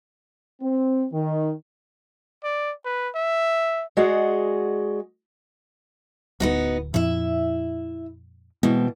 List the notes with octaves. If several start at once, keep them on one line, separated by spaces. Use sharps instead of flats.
C4
D#3
D5
B4
E5
G#3 F#4 G#4 D5 D#5 F#5
D1 D2 B3 D#4 F#4
F2 A#2 F3 E4 E5
B2 E3 G#3 B3 C4